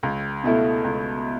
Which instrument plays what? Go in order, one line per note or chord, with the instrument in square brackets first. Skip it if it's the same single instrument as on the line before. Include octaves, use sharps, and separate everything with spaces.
[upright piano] C#2
B2 A3 E4
C#2